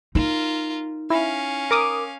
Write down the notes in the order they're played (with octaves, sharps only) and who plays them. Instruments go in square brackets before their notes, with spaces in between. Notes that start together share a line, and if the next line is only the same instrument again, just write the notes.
[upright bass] D#4 [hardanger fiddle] F4 A#4
[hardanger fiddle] C#4 F5 [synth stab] E4
[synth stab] A#4 D6 D#6